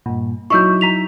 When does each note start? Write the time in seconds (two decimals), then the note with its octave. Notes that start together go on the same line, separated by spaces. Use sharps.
0.06 G2 A#2
0.50 F#3 D#4 E4 C#6 E6 G6
0.81 A#5 B6 F7